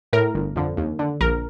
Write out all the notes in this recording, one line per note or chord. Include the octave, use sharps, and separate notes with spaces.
A2 A#4
G1
F2 D3
D#2
D3
A#1 A#4